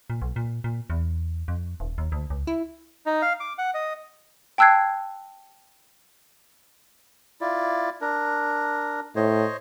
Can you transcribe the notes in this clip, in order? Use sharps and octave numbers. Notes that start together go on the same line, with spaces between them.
A#2
B1
A#2
A#2
E2
F2
D#1
D#2
D2
C#2
E4
D#4
F5
D6
F#5
D#5
G5 A5 E6 F#6 G#6 C7
E4 F4 D5
D4 A#4
A2 C5 C#5 D#5